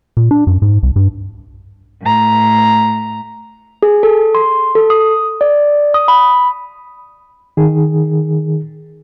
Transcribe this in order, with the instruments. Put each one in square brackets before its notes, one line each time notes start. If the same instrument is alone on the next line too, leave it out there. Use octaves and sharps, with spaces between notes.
[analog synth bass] A#2
D4
F#2
G#2
C2
G2
[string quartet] A2 A#5
[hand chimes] G#4
A4
C6
A4
D#6
D5
D#6
B5
[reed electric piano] D#3 G#4